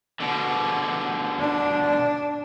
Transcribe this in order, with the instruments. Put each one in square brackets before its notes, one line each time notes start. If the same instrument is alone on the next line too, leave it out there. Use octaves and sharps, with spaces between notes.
[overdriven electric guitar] B2 D3
[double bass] D4